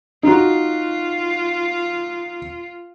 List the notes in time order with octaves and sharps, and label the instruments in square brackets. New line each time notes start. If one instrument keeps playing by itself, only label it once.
[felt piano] D#4 F#4 [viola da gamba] F4